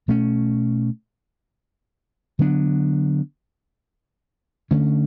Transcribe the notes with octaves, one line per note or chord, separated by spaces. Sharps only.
B2 A3 C#4
D3 F#3 B3 D4
D3 A3 C#4